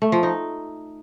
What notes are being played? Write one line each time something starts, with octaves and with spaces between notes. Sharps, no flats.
A3
F3
D#4